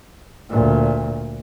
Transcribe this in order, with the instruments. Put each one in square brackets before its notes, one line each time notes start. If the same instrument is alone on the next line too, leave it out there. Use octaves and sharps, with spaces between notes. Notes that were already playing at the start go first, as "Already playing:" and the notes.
[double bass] D2 A#2